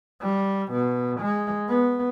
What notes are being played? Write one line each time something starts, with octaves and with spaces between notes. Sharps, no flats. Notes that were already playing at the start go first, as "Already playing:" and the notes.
G3
B2
G#3
B3